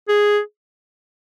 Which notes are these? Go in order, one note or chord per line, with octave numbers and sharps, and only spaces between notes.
G#4